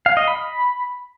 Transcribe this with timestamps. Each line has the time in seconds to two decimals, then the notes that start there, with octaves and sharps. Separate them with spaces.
0.06 F5
0.17 D#5
0.28 B5